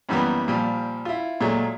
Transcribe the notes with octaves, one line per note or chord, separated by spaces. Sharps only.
F#2 E3 G3 A#3 B3
A#2 F3 G3
E4 F4
A#2 F#3 G#3 A3